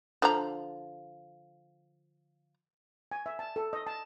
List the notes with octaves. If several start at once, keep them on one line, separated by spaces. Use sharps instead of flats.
D3 F3 A#5
G#5
E5
A5
A4
D#5
A5